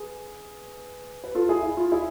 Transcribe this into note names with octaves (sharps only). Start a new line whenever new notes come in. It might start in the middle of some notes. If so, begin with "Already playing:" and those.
Already playing: G#4 B4
B4
F4 A4
E4 G#4
E4
F4
E4 G#4